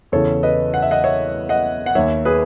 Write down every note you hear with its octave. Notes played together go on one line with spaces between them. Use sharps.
E2 C#3 E3 A4 C#5
B4 D#5
F#5
E5
D#5 F#5
C#5 E5
D#5 F#5
F#5
D#2 D#3 C#5 E5
G#4 B4